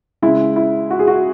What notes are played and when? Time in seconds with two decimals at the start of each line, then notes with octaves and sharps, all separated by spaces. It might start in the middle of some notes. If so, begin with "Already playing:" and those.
0.22 C#3 G#3 E4
0.56 E4
0.90 F#4
0.99 G#4
1.07 F#4